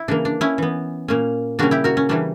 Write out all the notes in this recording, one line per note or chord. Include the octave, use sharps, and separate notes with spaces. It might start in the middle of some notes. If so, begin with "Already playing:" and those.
Already playing: E4
C#3 E3 A#3 D4
D4
C#4 E4
E3 B3
A#2 A#3 C#4
C#3 G3 A#3 C#4 D4 F#4
E4 G4
F#4 A#4
C#4
C#3 E3 G3 C#4 D4